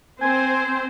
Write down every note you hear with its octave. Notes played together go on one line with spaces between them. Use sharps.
C4 C5 G#5